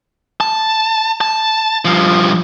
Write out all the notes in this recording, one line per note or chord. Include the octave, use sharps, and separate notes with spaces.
A5
A5
G2 F3